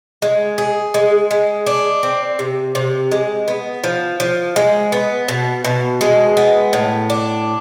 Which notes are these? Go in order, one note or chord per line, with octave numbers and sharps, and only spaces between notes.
G#3
G#4
G#3
G#3
D4
C4
C3
C3
G#3
B3
F3
F3
G#3
B3
B2
B2
G#3
B3
A2
D4